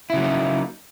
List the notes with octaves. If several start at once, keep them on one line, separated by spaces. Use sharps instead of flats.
C#3 F#3 A#3 D#4 E4